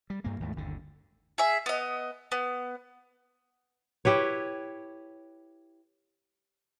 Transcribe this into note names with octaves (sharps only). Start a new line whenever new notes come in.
G3
G2 A#3
D#2 G#2 A3
G1 D#2 D3
G#4 E5
B3 D#5
B3
E4 G4 B4 C#5